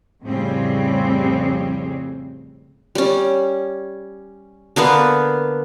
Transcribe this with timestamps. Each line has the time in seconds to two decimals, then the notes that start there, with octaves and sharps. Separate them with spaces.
0.24 F2 A2 C#3 G3 C4
2.95 G3 C#4
4.76 D3 A#3 B3 B4